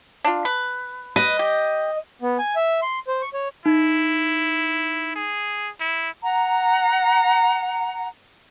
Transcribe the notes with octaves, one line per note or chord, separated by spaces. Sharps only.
D4 F4
B4
B4 D#5
G4
B3
G#5
E5
C6
C5
C#6
C#5
D#4 E4
G#4
E4
F#5 A#5